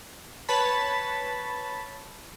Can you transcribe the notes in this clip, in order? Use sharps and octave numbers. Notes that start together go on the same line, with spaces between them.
B4 C#5 A5 B5